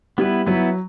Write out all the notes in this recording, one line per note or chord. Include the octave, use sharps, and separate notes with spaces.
G3 B3 E4 B4
F#3 B3 E4 B4